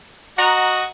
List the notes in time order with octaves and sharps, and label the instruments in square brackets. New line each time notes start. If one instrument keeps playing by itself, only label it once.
[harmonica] F#4 D#5 [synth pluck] F#5 A#5